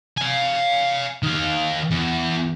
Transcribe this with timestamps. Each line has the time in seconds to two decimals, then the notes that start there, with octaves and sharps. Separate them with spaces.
0.17 F5 G#5
1.23 D#3 F5
1.91 E2